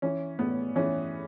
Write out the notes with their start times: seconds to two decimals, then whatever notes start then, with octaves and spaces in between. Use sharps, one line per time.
0.02 E3 C#4
0.39 A2 B3
0.76 E3 C#4